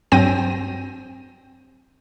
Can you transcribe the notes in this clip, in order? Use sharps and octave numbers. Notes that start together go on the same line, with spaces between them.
G2 F#3 C4 G5 A#6 D#7